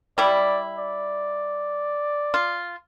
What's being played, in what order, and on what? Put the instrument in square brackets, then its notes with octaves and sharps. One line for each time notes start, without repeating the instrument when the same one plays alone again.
[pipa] G3 E4 [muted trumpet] D5
[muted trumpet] D5
[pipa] F4